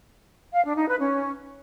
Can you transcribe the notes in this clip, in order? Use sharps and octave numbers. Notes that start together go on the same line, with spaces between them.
F5
D4
D#4
B4
C#4